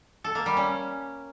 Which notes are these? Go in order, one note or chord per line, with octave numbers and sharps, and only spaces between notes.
A4
A#3
G3
C#4